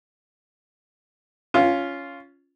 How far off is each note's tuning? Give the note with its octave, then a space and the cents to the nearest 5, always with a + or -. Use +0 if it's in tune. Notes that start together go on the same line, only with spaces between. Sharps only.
C#4 +10 F4 -5